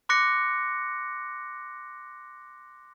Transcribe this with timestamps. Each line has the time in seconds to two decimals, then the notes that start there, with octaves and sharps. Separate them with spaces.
0.09 C6 D6 F#6 A#6 C#7